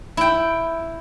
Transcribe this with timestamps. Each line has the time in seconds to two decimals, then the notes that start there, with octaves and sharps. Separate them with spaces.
0.17 E4 G5